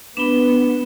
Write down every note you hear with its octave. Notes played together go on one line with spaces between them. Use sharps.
B3 D4 B4 B5 E7 G7